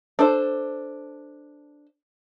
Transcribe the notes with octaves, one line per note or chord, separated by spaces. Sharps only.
D4 A4 C5